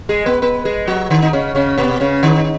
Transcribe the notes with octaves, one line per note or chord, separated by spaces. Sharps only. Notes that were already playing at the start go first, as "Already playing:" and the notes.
G#3 G#4
B3 B4
B3 B4
G#3 G#4
F#3 F#4
D#3 D#4
D#4
C#3 C#4
C#3 C#4
B2 B3
C#3 C#4
D#3 D#4